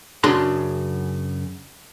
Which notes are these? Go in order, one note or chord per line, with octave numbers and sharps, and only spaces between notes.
F#2 C#3 D4 G#4 A#5 C6